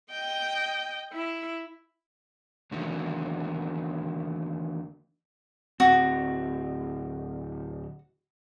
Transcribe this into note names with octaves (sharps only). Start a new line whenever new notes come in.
D#5 G5
E4
E2 D3 D#3 F#3 A3 A#3
D1 C4 F#4